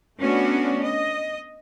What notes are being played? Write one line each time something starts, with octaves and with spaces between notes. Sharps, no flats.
A3 B3 C#4 D4 F#4
D#5